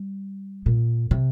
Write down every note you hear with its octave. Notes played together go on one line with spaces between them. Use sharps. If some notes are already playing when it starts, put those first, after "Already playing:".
Already playing: G3
A#2
C3